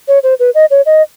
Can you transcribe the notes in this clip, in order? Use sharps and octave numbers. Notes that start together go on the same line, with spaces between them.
C#5
C5
B4
D#5
C#5
D#5